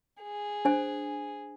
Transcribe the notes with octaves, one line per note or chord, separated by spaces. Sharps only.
G#4
D4 C5 G#5